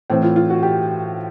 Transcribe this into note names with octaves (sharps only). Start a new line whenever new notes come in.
A2 E3 C4
F4
F4
F#4
G4